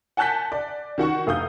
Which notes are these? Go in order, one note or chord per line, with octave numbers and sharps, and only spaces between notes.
F#5 G#5 A5 F#6 G6 B6
D5
D#3 F#4 F#5 C#6
F1 F5 D#6 G6